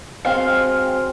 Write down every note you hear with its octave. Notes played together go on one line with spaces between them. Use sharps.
F#3 G#3 C4 C5 F5 G5 G#5